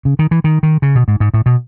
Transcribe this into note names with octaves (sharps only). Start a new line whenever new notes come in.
C#3
D#3
E3
D#3
D#3
C#3
B2
G#2
G#2
A2
B2